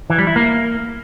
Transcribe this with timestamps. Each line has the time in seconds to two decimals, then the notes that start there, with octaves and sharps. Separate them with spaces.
0.10 E3
0.18 G3
0.27 E4
0.36 A#3